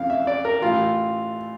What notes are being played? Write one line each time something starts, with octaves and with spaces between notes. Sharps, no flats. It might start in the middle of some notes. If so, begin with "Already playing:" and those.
Already playing: F2 C#3 E3 F5
E5
D5
A#4
A1 A2 E3 F4